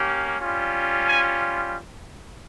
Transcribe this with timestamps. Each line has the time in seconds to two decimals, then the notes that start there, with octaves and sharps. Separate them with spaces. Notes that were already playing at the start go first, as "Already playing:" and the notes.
Already playing: A#3 C#4 G4
0.40 G3 C#4 F4
1.08 G#5